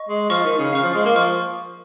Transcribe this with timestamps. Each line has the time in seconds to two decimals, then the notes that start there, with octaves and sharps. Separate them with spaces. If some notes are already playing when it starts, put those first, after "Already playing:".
Already playing: D#5 C#6
0.09 G#3
0.30 F3 D#5 C#6 F6
0.44 D#3
0.58 C#3
0.73 C#3 F5 C#6 F6
0.83 F3
0.94 G#3
1.05 A#3
1.16 F3 C#6 F6